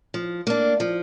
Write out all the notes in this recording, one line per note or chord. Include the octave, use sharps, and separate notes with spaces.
F3
A#3 D4
F3